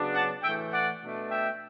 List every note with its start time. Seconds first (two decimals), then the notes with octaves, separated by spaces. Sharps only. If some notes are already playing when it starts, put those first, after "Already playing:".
Already playing: C#3 F#3 B3 D4
0.13 F#5 A5
0.42 A2 E3 A3 E5 G5
0.71 D5 F#5
1.02 B2 A3 D4
1.31 E5 G5